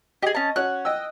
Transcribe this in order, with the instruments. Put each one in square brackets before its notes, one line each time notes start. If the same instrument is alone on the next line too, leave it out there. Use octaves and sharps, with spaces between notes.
[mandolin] G4 G#4 [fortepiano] D#5
[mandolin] C#4 A5
[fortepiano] C#4 F#4 [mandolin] F#6
[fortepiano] D#5 G5 E6